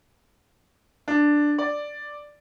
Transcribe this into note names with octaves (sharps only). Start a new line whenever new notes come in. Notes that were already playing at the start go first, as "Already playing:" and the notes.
D4
D5